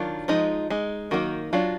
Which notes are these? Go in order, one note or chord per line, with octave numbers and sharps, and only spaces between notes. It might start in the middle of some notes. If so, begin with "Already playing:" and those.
Already playing: D#3 F#3 D4 F4
F3 G#3 D#4
G#3 D#4
D#3 F#3 A#3 D#4 F#4
F#3 D4 F4